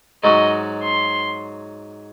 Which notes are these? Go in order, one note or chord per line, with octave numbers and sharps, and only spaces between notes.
G#2 F#3 C#4 F#4 D#5
C6